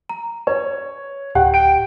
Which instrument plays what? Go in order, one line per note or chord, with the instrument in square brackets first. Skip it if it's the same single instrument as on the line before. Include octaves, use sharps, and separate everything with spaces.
[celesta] A#5
[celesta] B4 [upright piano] C#5
[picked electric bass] D1 [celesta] G4 [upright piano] F#5 G5
[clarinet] G5 [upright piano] D7